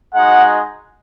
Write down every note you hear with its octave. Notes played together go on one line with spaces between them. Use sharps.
G#3 D#4 F#4 F#5